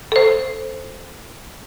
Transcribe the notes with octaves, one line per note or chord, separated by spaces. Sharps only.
A4 C5